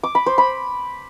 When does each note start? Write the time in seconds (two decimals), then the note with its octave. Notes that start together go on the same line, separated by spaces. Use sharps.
0.03 D6
0.15 B5
0.26 C5
0.38 B5